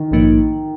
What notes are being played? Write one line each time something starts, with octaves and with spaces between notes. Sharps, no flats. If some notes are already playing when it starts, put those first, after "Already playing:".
Already playing: D#3
A#1 G#2 F3 A#3 D#4